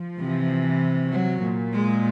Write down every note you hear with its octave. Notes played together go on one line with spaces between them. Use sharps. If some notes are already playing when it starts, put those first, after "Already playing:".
Already playing: F3
C3 E3
F#3
A#2
G#3